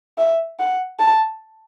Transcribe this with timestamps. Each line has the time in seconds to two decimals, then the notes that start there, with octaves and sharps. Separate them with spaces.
0.18 E5
0.59 F#5
1.00 A5